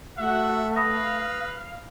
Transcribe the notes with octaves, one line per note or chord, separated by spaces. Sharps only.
A3 F#4 E5 F#5
B4 F5 B5 D#6 A#6